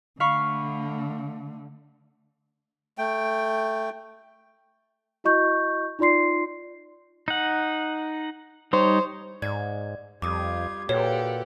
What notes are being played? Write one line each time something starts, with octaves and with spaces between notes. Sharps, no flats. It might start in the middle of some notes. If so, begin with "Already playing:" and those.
D3 A3 F5 B5 C#6
A3 G5
E4 F#4 D#5 C#6 G6
D#4 F4 D5 C6 C7
D#4 F#5
G3 D#4 C5 C#5
G#2 D5 G#6
F2 G3 F4 D6 D#6 G#6
A#2 F#4 G4 A4 B4 C#5 F#5